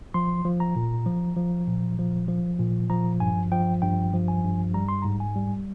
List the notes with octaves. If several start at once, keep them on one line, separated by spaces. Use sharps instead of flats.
F3 C6
F3
A#5
A#2
F3
F3
A#2
F3
F3
A#2
F3 A#5
G2 G#5
F3 G5
G2 G5
F3
G#5
G2
G3 A#5
C6
G#2 A#5
G#5
G3